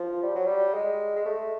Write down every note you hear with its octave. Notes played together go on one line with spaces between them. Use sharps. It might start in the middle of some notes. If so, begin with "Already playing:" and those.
Already playing: F3
G3
F#3
G3
G#3
G#3
A3